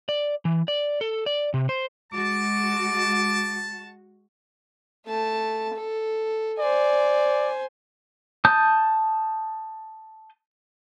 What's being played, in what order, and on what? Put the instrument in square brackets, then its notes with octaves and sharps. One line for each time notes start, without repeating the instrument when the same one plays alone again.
[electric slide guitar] D5
E3
D5
A4
D5
C3
C5
[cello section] G#3 F#4 [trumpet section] A5 [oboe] D6
[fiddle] A3 A5
A4
[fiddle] C5 G#5 [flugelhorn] D5
[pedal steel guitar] A5 D#6 G6